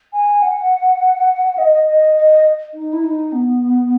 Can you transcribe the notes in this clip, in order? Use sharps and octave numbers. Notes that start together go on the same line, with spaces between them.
G#5
F#5
D#5
D#5
D#5
D#4
E4
D#4
B3